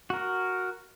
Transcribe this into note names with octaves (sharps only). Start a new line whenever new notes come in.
F#4 A#4